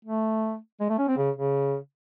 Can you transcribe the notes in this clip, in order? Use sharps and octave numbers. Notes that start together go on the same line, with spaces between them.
A3
G#3
A3
C#4
C4
C#3
C#3